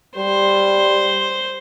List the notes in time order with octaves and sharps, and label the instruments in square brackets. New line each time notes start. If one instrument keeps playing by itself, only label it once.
[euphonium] G3 [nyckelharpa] C5